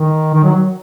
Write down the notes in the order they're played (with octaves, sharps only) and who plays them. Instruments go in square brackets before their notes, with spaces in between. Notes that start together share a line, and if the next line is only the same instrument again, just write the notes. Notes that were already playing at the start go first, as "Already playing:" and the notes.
Already playing: [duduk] D#3
D#3
F#3